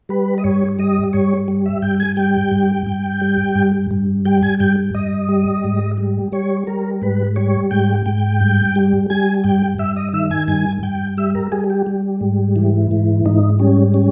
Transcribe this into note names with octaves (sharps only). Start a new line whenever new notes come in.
G3 B4
D#5
G2 C#5
G3 D#5
G2 C#5
G3
E5
G2 G5
G#5
G3 G5
G2
G2
G3
G2
G2
G3 G5
G#5
G2 G5
G2 D#5
G3
G#2
G3
G3 C#5
G3 A#4
G#2 B4
G3 C#5
G#2 G5
G#2 G5
G2
G3
G3 G#5
G2 G5
G2 E5
D#5
D#3 E5
G#5
G2 G#5
G2 G5
G3 E5
A#4
G3 G#4
G4
G3
G#2
E3
G#2
G#2 D#4
G3 C#4
C#4